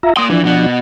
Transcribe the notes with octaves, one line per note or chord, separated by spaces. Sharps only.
F4 E5 A#5
A#3 C6 D#6
E3 F3 D4
B2 B3